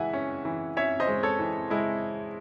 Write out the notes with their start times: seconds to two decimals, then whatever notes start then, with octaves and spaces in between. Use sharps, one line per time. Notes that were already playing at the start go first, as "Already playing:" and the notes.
Already playing: E3 G#3 E5 F#5 G#5
0.13 C#4
0.45 E3
0.77 C#4 C#5 E5
1.00 C5 D#5
1.07 G#3
1.23 A4 C#5
1.39 E3
1.70 G#3 E4